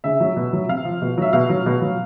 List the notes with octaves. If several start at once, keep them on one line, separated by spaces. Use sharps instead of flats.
C#3 E5
F#3
B2
F#3
C3 F5
F3
B2
F#3 E5
B2 F5
F#3
B2
F#3